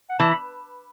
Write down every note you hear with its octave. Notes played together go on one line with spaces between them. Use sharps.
F#5
E3 A5
B5